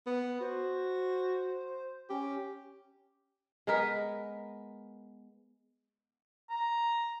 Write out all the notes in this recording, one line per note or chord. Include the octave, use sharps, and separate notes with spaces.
B3
F#4 C5
C#4 G4
G#3 B3 A#4 B4
A#5